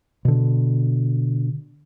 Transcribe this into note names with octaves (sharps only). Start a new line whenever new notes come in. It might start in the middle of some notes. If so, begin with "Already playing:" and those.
B2 D3